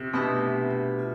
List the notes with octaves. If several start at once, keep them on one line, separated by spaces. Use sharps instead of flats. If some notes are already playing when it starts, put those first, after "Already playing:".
Already playing: C3
B2 A3 D4 G4 B4 E5
F4